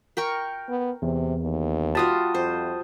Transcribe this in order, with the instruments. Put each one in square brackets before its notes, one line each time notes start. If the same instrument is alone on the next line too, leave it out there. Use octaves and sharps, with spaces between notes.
[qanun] A#4 G5 C#6
[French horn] B3
[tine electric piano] E2 [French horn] C3
[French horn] D#2
[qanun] G3 F4 F#4 [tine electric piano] A5 D#6
[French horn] F2 [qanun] C5